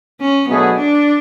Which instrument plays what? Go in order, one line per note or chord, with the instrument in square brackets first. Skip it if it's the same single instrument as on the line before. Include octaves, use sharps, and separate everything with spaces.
[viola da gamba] C#4
[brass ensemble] B2 F#3 A3 D4 G#4 [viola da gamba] B3
[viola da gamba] D4